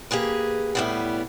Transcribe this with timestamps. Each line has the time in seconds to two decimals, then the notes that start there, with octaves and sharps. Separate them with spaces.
0.11 A#3 G4 G#4 B4
0.75 A2 G3 B3